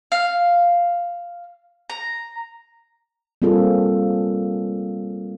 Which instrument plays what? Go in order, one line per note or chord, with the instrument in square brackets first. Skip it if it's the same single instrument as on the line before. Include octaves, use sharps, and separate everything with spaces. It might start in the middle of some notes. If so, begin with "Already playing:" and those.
[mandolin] F5
A#5
[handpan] G3 A#3 C4 F4 G#4 A4